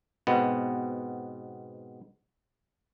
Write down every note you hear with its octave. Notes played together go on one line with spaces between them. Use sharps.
G#2 B2 B3 C4